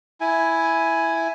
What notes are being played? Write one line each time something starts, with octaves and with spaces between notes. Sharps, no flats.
E4 G#5